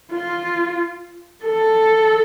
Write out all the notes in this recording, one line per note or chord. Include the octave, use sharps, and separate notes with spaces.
F4
A4